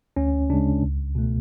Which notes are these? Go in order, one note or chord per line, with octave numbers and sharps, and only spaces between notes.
D2 C#4
C#3 G#3 D4
C#2
B2 A3